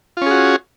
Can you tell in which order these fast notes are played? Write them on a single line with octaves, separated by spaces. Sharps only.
F4 C#4 G#4 F#4